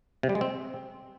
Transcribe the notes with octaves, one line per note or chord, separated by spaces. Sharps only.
C3
G3
G#3
C4